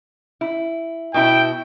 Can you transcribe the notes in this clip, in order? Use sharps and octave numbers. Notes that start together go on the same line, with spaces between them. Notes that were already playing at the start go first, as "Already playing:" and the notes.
E4
B2 E4 G5